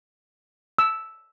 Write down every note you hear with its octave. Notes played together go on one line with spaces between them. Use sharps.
E6